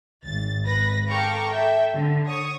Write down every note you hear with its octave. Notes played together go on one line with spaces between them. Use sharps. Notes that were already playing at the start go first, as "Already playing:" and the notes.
G#1 A6
G#1 B4 A#6
A4 F5 G5 A#5 C#6 D6
A4 E5 G5
D3
C#5 C#6 D#6